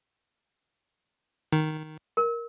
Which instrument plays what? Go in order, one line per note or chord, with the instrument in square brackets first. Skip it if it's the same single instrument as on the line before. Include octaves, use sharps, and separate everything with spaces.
[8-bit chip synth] D#3
[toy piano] A#4